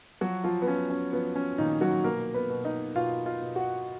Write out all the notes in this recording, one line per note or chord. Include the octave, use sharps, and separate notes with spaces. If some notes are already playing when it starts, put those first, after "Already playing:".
F3 F#3 F#4
F3 F4
B3
F3 C#4
C#4
F3 B3
C#4
A#2 D#3 D#4
F#3 F#4
B2 A#3 A#4
B3 B4
B2
D#4 D#5
B2 F4 F5
F4 F5
B2
F#4 F#5